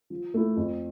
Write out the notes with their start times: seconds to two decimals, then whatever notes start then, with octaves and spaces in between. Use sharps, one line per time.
0.10 F3
0.34 A3 E4
0.56 F2